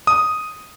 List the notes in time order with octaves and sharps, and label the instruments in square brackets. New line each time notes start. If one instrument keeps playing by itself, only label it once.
[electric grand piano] D#6